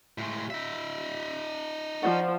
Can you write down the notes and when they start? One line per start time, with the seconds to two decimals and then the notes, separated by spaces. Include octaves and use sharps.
0.18 A2 G#3
0.50 D#4 E5
2.03 F3 D5 F#5 C#6